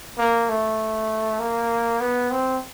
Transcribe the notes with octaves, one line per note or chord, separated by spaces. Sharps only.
A#3
A3
A#3
B3
C4